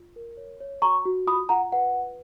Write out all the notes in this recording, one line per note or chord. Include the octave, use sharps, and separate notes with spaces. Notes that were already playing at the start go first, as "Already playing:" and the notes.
Already playing: F4
A#4
C#5
C#5
F#4 A#5 C#6
F#4
F4 B5 D#6
F4 F#5 A#5
B4 F#5
B4